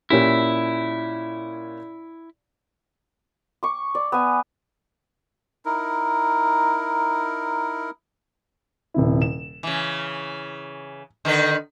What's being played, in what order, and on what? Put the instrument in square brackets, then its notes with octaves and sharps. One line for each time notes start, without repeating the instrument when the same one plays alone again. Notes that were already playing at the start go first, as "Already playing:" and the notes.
[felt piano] A#2 C#4 G4 [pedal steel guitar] E4
[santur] C#6 D6
D5
B3 G#5
[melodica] D#4 E4 A#4
[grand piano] D#1 C3 E4
E7
[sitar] C#3 E3
D3 D#3 B4